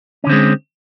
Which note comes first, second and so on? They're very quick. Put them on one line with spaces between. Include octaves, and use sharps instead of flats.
C#4 D3 C4 G#3